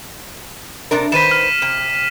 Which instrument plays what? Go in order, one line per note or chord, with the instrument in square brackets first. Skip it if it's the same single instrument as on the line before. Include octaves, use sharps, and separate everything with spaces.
[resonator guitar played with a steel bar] C3 D4 A#4
[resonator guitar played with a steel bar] D#3 B4 C5 [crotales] B6 D#7 E7
[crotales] F6
[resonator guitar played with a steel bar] C3